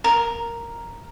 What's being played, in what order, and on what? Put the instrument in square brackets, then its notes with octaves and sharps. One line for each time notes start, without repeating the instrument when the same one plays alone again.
[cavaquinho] A#4